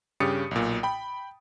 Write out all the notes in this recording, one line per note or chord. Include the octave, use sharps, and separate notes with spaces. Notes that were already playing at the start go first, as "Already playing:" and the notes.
G2 C#3 G4 D#6 A6 C#7
B1 A#2
G5 B5